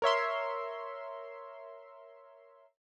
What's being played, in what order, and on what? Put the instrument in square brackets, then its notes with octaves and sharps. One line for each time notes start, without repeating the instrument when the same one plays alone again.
[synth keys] A#4 C#5 E5 C6